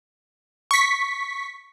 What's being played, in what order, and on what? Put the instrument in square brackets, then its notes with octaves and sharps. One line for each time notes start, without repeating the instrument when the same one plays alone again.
[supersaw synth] C#6 B6